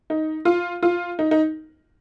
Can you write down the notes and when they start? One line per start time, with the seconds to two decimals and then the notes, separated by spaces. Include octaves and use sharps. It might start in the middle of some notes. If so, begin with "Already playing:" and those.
0.10 D#4
0.45 F4
0.83 F4
1.19 D#4
1.31 D#4